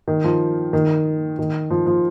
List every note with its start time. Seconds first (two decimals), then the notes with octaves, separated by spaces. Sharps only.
0.08 D#3
0.24 F3
0.73 D#3
1.39 D#3
1.71 F3
1.87 F3